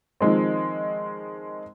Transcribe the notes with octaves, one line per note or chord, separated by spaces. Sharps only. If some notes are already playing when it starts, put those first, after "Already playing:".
D#3 F3 G#3 C4